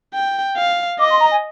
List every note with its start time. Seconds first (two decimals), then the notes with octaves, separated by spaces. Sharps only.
0.14 G5
0.57 F5
0.99 D#5 D6
1.10 C6
1.21 A#5
1.31 G#5